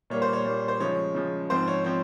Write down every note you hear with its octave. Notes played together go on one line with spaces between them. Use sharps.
A#2 G3 A#3 C#5
C5
C#5
A#2 G3 A#3
C5
C#3 F3 G#3 C#5
C#3 F3 G#3
G#2 F3 C4 C5
C#5
F3 C4 C#5